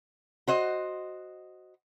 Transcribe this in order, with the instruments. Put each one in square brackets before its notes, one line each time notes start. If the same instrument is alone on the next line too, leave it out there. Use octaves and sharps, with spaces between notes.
[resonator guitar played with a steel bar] F#4 C5 D#5